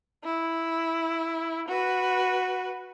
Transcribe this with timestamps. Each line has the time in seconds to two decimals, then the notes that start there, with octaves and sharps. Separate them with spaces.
0.24 E4
1.68 F#4 B4